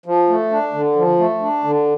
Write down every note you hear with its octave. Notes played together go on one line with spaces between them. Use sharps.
F3
A3
D4
D3
F3
A3
D4
D3